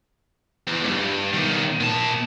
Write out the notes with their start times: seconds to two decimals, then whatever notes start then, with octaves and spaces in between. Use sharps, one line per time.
0.67 E2
0.84 C2 G2
1.33 B1 D#3
1.80 A#2 A5